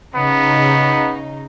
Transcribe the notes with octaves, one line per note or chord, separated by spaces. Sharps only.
C#3 B3 D#4